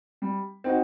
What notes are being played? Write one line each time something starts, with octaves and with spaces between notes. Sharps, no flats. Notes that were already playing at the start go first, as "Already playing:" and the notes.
G3
C4 D#4 F#4